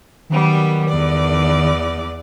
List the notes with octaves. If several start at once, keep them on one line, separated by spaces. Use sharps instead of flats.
D#3 F#3 G3 B3
E2 D5